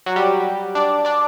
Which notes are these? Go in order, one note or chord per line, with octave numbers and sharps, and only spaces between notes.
F#3 F#4
G3 G4
D4 D5
D4 D5